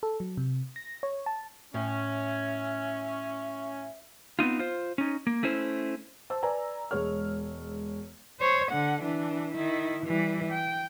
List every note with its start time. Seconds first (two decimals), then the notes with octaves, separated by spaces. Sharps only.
0.03 A4
0.20 F#3
0.37 C3
0.76 A#6
1.03 C#5
1.26 A5
1.74 A2 C#4 E5
4.39 B3 C4 D#4 F4
4.59 F4 C5
4.98 C#4 D#4
5.27 A#3
5.43 A3 C#4 E4 C5
6.30 C5 A5 E6
6.43 B4 D5 G#5 A#5
6.91 E1 G#3 C#5 F6
8.40 C5 C#5
8.71 D3 F#5
9.02 E3 D4
9.54 D#3 E4
10.05 E3 G3
10.52 G5